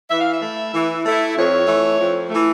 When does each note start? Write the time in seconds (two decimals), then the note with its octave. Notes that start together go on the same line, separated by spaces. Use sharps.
0.10 E3 E5
0.20 F5
0.31 E5
0.41 A3 E4
0.72 E3
1.04 A3 E4
1.35 F2 C#5
1.67 E3 A3
1.98 F2
2.30 E3 A3